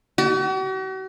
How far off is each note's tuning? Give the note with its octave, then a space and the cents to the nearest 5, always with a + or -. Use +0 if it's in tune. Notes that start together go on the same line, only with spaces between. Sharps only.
F#4 +45